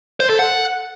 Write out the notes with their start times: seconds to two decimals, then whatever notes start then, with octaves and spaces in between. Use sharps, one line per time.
0.20 C5
0.30 A4
0.39 F#5